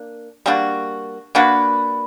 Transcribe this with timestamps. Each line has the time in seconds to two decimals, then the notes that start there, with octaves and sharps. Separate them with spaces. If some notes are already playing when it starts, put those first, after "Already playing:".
Already playing: A#3 D4
0.46 G3 A#3 D4 F#4
1.35 A#3 D4 F#4 B4